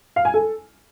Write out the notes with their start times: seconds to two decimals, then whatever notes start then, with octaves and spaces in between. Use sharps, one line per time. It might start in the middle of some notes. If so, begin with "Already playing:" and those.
0.16 F5
0.25 G#5
0.34 A4